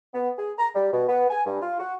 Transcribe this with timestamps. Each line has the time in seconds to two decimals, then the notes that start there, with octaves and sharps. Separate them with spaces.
0.14 B3
0.38 G#4
0.59 A#5
0.75 G3
0.92 B2
1.08 B3
1.30 G#5
1.46 G2
1.62 F4
1.79 F#4